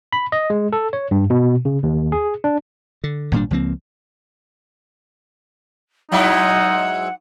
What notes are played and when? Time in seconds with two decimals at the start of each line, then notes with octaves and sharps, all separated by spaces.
0.13 B5
0.32 D#5
0.50 G#3
0.73 A4
0.93 C#5
1.11 G2
1.30 B2
1.65 C#3
1.83 D#2
2.12 G#4
2.44 D4
3.04 D3
3.32 G#1 A#2 G3 D4
3.51 C#2 F3 A#3 C4
6.12 G#2 F#3 D#4 E4 F#5